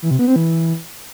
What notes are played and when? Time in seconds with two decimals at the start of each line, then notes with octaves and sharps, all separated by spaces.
0.02 E3
0.11 C3
0.19 B3
0.28 C4
0.36 E3